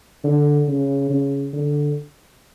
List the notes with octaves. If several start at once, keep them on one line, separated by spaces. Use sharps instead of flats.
D3
C#3
C#3
D3